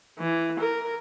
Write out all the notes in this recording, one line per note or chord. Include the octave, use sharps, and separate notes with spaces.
E3
A#4